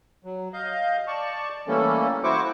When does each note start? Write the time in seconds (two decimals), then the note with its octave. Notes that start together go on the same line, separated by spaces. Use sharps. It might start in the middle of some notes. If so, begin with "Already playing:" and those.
0.24 F#3
0.53 D#5 F5 G6
1.07 D5 A5 C#6
1.68 E3 G3 A3 A#3 C#4 A4
2.24 E4 F#4 C5 C#6 D6